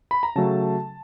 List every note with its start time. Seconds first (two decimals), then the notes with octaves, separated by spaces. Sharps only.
0.11 B5
0.23 A#5
0.35 C#3 F#3 A3 A5